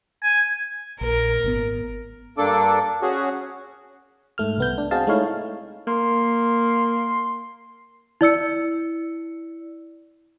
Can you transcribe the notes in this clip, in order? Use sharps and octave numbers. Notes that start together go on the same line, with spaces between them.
G#5
A#1 A#4
G#1 B2 B3
G2 A#3 D4 A4 D6
C#4 F#4 G#4
G#2 A3 F6
C2 B3 G6
D4
C4 F#4 G#4 D#5 F5 A5
G#3 A3 D#4 E4 C#5 F5
A#3 C6
E4 D5 E6 C#7